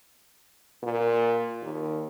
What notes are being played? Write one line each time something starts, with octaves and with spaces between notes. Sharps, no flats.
A#2
D#2